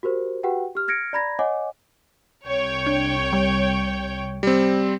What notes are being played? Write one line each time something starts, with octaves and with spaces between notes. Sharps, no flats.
F#4 G4 A#4 C5
F#4 G4 B4 F#5 G5
G4 F6
F6 G#6 A#6 C#7 D7
D5 A#5 B5 G#6 A#6
C#5 D#5 F#5 G#5 D6
C2 C#5 G5
D4
G3
G3 C4